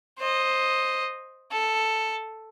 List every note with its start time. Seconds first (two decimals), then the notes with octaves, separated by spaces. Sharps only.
0.19 C5 D#5
1.52 A4